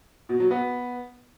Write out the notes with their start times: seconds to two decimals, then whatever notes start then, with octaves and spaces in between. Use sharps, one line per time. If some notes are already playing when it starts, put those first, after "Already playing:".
0.29 B2
0.40 F#3
0.51 B3